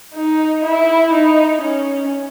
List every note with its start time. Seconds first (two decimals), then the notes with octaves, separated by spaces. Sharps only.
0.15 D#4
0.64 E4
1.13 D#4
1.61 C#4